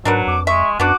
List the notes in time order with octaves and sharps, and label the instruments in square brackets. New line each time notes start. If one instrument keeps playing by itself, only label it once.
[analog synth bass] G#2 [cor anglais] F#3 [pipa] D4 A#4 B4
[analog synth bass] F2 [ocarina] D6
[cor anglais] G#3 [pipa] E5 [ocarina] C#6
[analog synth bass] F#2 [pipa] B3 D4 [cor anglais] F#4 [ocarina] D6